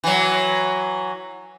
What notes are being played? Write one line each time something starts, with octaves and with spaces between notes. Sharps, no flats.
E3 F#3